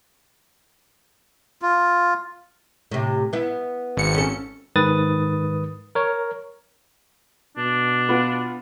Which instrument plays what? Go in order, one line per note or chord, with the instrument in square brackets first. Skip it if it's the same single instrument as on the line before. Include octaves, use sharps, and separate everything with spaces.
[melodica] F4
[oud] A2 C3
B3 E4
[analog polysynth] G#1 C#7
[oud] C#4 A4
[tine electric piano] G#2 D#3 B4 D#6 A6
A#4 C#5
[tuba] B2 [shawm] D4
[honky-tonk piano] B3 F4